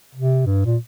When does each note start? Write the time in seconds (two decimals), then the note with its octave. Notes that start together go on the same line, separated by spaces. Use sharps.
0.15 C3
0.46 G2
0.65 A#2